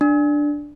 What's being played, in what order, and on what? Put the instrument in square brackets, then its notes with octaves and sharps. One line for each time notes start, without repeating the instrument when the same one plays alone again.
[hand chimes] D4